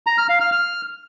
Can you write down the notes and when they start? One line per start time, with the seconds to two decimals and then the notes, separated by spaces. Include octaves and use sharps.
0.07 A#5
0.18 F6
0.29 F5
0.40 F6
0.52 F6